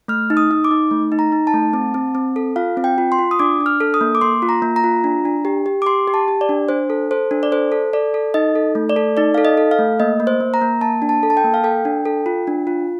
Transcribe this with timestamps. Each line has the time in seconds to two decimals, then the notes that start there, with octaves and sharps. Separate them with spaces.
0.08 A3 F6
0.30 D#4
0.37 D#6
0.51 D#4
0.64 D6
0.71 D#4
0.91 A3
1.12 D#4
1.19 A#5
1.32 D#4
1.47 A5
1.54 A3
1.73 C4
1.94 C4
2.15 C4
2.36 A4
2.56 F4 F5
2.77 C4
2.84 G5
2.98 F4
3.12 C6
3.19 F4
3.31 D#6
3.39 D4 D6
3.60 D4
3.66 F6
3.81 A4
3.94 D#6
4.01 A#3
4.15 D6
4.21 A#3 C6
4.42 F4
4.49 A#5
4.62 A#3
4.76 A#5
4.84 F4
5.04 D4
5.25 D4
5.45 G4
5.66 G4
5.82 D6
5.86 G4 C6
6.08 G4
6.14 A5
6.28 G4
6.41 D5
6.49 D4
6.69 D4 C5
6.90 A4
7.11 A4 C5
7.31 D4
7.43 D5
7.52 A4 C5
7.72 A4
7.93 A4 D5
8.14 A4
8.34 D#4 D#5
8.55 A4
8.75 A3
8.89 D5
8.96 A4
9.17 D#4 D5
9.34 A4 F5
9.45 D#5
9.57 A4
9.71 F5
9.79 A3
10.00 A#3 D#5
10.20 A#3
10.27 C5
10.40 A#3
10.54 A#5
10.61 A#3
10.81 A#3 A5
11.02 D4
11.09 A5
11.23 A4
11.30 A5
11.37 G5
11.44 A#3
11.54 F5
11.64 A4 G5
11.85 D4
12.05 A4
12.26 F4
12.47 D4
12.67 F4